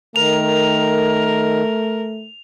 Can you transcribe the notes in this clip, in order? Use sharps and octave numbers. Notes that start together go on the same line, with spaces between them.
D#3 A3 A#4 F7